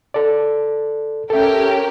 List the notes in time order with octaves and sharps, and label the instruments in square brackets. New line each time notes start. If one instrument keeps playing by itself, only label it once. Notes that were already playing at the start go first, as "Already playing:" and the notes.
[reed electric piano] A4 D5
[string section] C#4 G4 A#4 [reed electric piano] A4 E5